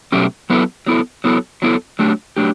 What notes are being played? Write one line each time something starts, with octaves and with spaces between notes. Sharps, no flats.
B2 F#3 A3 C#4 G4
F#3 B3 E4 A4
F#3 B3 E4 A4
F#3 B3 E4 A4
F#3 B3 E4 A4
F#3 A3 D4 G4
F#3 A3 D4 G4